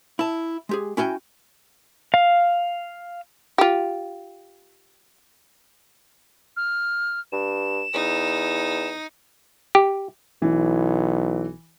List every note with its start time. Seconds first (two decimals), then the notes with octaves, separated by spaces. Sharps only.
0.19 E4 A5
0.69 G#3 G4 G#4
0.97 C#4 E4 F#4 G5 G#5
2.14 F5
3.58 F4 G4
6.57 F6
7.32 G2 E7
7.94 E2 D#4
9.75 G4
10.42 B1 E3